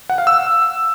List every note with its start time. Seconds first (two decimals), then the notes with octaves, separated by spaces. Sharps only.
0.10 F#5
0.18 F5
0.27 E6